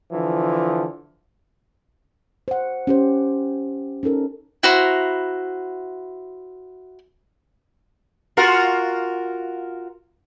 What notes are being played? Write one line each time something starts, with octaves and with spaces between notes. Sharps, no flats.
D3 E3 F3
C5 F#5
C#4 G4 C5
C#4 D#4 A4 A#4
E4 F#4 C5 A#5
F4 F#4 A#4